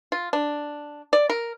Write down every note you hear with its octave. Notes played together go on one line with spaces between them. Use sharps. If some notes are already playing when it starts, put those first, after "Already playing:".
F4
D4
D5
A#4